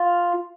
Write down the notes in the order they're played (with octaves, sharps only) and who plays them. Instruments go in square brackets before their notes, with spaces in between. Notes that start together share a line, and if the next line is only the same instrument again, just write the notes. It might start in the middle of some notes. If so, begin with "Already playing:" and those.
Already playing: [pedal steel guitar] F4 F5